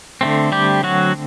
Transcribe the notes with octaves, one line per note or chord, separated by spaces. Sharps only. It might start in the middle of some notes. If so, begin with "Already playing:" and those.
D3 A3 C4
G3 G4
F#3 F#4